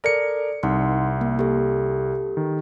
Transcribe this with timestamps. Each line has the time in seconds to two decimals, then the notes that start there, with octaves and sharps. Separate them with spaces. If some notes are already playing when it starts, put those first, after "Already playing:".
0.04 A4 A#4 D5 C#7
0.63 C2 D#4 F#5 C6
1.21 A#3
1.39 G4 A4
2.37 D#3